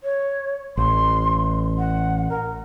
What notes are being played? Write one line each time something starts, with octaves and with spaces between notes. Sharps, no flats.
C#5
A1 C6
F#5
A#4